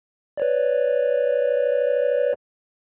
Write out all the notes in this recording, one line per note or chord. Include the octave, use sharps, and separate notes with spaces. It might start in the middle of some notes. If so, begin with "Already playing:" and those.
B4 C#5 D5